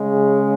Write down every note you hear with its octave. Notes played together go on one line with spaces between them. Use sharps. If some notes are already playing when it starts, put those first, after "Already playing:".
Already playing: C#3 G#3